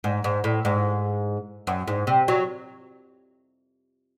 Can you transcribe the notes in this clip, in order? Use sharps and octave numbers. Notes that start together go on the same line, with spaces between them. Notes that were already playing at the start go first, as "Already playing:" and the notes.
G#2
G#2
A2
G#2
F#2
G#2
C3
F#3